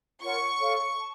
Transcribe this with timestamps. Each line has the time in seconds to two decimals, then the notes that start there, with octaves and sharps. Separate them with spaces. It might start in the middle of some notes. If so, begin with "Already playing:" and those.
0.22 F4 A#4 C#5 F#5 C#6
0.61 A4 C#5 F5
0.98 A5